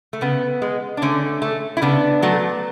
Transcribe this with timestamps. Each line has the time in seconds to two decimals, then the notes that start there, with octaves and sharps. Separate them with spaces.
0.13 A3
0.21 C#3 B3
0.62 G#3
0.97 D4
1.02 D3 A3 C#4
1.42 A3
1.77 E4
1.82 C#3 B3 D4
2.22 F#3 A3